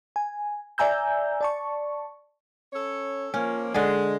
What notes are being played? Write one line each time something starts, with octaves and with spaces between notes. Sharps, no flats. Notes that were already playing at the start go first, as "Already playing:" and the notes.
G#5
D5 E5 G#5 A#5 E6 G6
D5 A5 C#6
C#4 A4 C#5
F3 A#3 C#4
D3 G#3 G#4